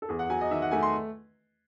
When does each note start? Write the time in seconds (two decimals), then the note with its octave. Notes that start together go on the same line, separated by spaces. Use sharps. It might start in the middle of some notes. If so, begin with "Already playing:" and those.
0.02 A4
0.09 E2 G#4
0.19 F#5
0.29 F#3 G#5
0.41 D#5
0.50 D#3 E5
0.62 F#5
0.71 A3 G#5
0.83 C6